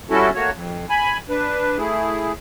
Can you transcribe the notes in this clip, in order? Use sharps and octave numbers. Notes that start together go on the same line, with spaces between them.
G3 C#4 E4 F#4 A4
A3 A#3 F#4 C#5
F2
G#5 B5
D4 B4
A3 E4 G#4